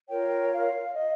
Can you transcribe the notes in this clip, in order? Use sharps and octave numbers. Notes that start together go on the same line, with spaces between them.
F4 A#4 C#5 G5
F5
D#5